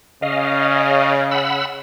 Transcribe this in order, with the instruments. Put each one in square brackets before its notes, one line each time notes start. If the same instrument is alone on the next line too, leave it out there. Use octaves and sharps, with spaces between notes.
[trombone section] C#3 [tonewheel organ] D#5 F5
[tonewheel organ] F#5 B5 E6